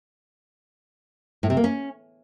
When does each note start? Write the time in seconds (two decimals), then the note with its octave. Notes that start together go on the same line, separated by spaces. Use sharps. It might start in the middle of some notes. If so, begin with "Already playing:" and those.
1.43 A2
1.50 C3
1.57 A#3
1.64 C#4